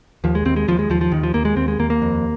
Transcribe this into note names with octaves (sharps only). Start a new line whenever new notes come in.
D#2 F3
G#3
D#2 C4
G#3
D#2 F3
G#3
D#2 F3
F3
D#2 D#3
F3
D#2 A#3
G#3
D#2 C4
G#3
D#2 A#3
A#3
F2